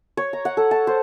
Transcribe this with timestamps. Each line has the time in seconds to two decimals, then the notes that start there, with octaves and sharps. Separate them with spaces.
0.17 C#5
0.33 A#5
0.45 F#5
0.57 A4
0.71 A5
0.87 C5